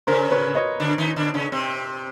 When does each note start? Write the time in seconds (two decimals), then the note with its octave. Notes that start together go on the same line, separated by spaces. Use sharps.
0.07 C#3 C#4 A#4 C5
0.31 B4 C#5
0.55 C#5 D#5
0.80 D3 D4
0.98 D#3 D#4
1.16 D3 D4
1.34 C#3 C#4
1.52 C3 C4